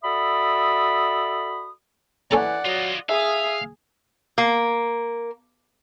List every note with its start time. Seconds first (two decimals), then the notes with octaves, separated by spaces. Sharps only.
0.03 F#4 A4 D5 E5 B5 D#6
2.31 E3 C#4 A4 D5 F#5 A#5
2.65 F#3 F4 D#5
3.09 G#4 E5 F5 D#6
4.38 A#3